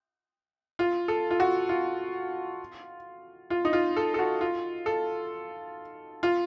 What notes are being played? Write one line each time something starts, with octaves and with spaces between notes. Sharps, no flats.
F4
A4
F4
F#4
F4
F4
D#4
F4
A4
A4
F#4
F4
A4
F4